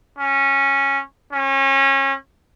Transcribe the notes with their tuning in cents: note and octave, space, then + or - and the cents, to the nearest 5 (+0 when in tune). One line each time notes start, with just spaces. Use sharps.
C#4 -10
C#4 -30